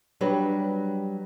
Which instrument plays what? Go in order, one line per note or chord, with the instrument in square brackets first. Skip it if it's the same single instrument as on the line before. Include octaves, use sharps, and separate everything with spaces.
[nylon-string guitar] F#3 G3 D4 G4 B4